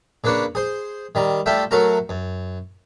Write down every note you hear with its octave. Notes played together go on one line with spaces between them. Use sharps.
C#3 A#3 D4 B4 C#5
G#4 C5
D#3 G3 A#5
G3 A3 F4 E5 G5
F#3 A3 F#4 A#4 A#5
F#2